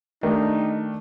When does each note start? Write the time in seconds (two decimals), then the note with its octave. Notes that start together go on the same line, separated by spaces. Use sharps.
0.23 D#3 A3 D4 D#4 G4 A#4